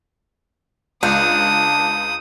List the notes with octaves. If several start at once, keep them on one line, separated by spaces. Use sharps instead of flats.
C#2 D4 D#6